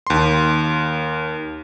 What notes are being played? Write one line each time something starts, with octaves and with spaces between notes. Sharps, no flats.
D#2 C6